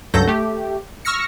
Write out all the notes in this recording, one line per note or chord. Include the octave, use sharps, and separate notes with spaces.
C#2 G2 F#3 A4 G6 A#6
A3 G4
C#6 E6 F6 A#6 C#7